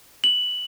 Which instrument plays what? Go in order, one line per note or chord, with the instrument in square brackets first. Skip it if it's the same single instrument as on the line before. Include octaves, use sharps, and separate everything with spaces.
[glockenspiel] F#7